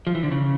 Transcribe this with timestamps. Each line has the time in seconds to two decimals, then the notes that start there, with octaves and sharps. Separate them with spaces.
0.07 F3
0.15 E3
0.23 D3
0.31 C#3